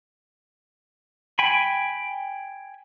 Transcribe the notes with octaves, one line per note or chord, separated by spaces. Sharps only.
G5 G#5 B5